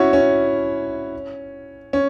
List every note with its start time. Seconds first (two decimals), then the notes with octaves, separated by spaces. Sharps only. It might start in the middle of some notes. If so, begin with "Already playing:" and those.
Already playing: C#4 E4 F#4
0.13 C#4
1.93 C#4